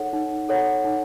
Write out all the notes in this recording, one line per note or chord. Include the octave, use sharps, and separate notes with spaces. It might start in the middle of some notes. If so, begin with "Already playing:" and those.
Already playing: D#4 A4 C#5 F#5
D#4
A4 C#5 F#5
D#4